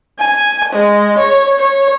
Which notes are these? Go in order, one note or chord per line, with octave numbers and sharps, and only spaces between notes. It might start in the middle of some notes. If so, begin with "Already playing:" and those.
G#5
G#3
C#5
C#5